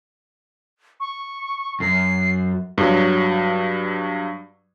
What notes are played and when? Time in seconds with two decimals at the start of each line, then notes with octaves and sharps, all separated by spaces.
1.00 C#6
1.80 F#2 C7
2.78 G2 F#3